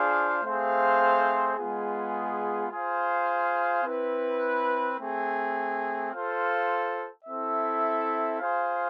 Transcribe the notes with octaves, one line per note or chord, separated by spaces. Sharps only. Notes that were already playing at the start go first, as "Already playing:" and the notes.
Already playing: D4 F4 G#4 C5 F5
A3 C4 G#4 C5 F5
G#3 B3 F4 G#4
F4 G#4 C5 F5
C4 E4 B4
A3 C4 G#4
F4 A4 C5 F5
C4 E4 A4 E5
F4 G#4 C5 F5